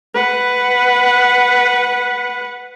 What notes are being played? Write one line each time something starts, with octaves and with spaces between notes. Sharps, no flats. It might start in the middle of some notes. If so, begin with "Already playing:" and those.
B4 F#5